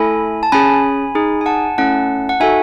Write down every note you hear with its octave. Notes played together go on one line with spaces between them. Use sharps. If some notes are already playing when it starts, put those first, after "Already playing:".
Already playing: A3 E4 A4 G#5 B5
A5
C#4 G#4 G#5 B5
D#4 G#4
G#5
F#5 A5
A3 C#4 E4 A4 F#5 A5
F#5
D#4 F#4 A4 E5 G#5